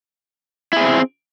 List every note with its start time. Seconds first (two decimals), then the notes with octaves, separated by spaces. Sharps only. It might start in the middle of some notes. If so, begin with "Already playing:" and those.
0.73 E4
0.77 G#4
0.81 C4